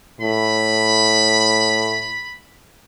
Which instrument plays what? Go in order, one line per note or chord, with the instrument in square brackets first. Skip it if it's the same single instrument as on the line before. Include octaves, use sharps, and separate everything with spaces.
[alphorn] A2 [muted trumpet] B5